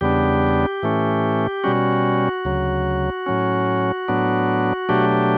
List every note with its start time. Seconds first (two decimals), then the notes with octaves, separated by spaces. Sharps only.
0.01 E2 C#3 G3 B3 D4 G4
0.83 A2 E3 A3 C#4
1.64 B2 G3 C#4 F#4
2.45 D2 C#3 F#3
3.26 A2 F#3 C#4
4.08 A2 F#3 B3 D4
4.89 B2 F#3 A3 D4 G4